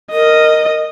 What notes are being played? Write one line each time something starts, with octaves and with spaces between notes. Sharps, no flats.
A#4 D#5